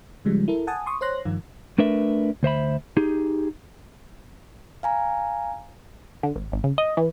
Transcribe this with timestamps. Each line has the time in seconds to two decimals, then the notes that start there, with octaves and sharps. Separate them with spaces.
0.25 C#3 F3 G3 G#3
0.48 E4 A4 A#4
0.67 F#5 G#5 A5 D#6
0.86 C6 C#6 D#6
1.01 C5 C#5 C6 F#6 A#6
1.25 G2 D#3 F3 F4
1.78 A3 D4 A#4 B4 E5
2.43 D2 C5 E5 B5
2.97 D#4 G4 G#4
4.83 F5 G#5 A#5
6.23 D3
6.36 G#1
6.52 G#1
6.64 C#3
6.78 D#5
6.97 E3